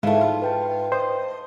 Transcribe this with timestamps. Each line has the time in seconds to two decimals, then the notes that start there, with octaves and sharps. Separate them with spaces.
0.03 G#2 E3 A3 D#4 F5
0.21 F4
0.42 B4 G5 A5
0.92 C5 D#5